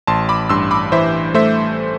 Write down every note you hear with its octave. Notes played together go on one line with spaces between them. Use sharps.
A1 A5 C6
B5 D6
G2 C6 E6
B5 D6
E3 C5 E5
A3 C5 E5